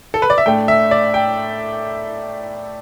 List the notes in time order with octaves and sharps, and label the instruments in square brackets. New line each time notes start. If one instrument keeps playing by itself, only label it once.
[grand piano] A4
B4
D5
E5
A2 A3 D4 G5
E5
D5
G5